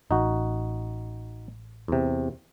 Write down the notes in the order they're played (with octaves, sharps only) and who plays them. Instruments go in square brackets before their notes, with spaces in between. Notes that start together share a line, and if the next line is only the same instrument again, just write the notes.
[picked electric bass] A1 [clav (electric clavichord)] D#4 F#4
[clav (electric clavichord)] E2 C3